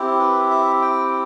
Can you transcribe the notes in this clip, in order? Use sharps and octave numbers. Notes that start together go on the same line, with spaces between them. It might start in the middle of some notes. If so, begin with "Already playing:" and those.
Already playing: C4 E4 G4
B4
E5
G5